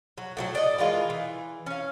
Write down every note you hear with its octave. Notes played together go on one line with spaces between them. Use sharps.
F#3
A2 E3 F#3
D5 D#5
E3 G#3 F4 A#4
E3
C#4 F5